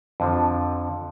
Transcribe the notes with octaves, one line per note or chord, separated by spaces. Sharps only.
F2 D3 F3